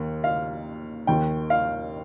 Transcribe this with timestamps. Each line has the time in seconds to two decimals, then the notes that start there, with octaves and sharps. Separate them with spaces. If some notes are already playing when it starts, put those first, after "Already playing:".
Already playing: D#2 D#3
0.24 F5
1.07 D#2 D#3 G5
1.50 F5